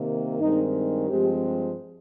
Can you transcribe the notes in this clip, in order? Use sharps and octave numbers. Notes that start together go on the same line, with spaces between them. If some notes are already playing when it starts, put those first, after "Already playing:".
Already playing: C3 D#3 A#3
G2 D#3 G#3 C4 D#4
G2 F3 G#3 C4 G4